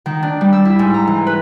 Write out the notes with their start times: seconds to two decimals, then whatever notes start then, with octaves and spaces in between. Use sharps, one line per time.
0.06 D#3
0.23 D4
0.41 G3
0.53 E6
0.65 E4
0.79 G#2
0.94 A#5
1.07 E3
1.27 B4